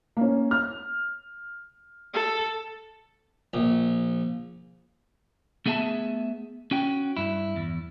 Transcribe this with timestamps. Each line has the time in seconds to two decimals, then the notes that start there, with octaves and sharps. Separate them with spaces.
0.17 A#3 C#4
0.51 F6
2.13 A4
3.54 A#1
5.66 A3 B3 G#4 E5 F#5 A5
6.71 C#4 F#4 G5
7.17 G2 E4
7.56 E2